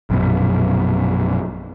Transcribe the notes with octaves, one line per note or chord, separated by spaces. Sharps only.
A#1 F#2 B2